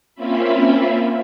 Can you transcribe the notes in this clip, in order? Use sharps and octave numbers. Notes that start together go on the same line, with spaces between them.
A#3 C4 C#4 F4 E5 B5